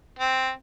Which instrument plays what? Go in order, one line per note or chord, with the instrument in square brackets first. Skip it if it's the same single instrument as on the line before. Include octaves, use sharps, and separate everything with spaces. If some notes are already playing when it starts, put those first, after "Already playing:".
[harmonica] C4